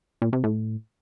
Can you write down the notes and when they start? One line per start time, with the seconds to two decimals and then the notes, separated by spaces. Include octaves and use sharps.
0.22 A#2
0.33 C3
0.44 A2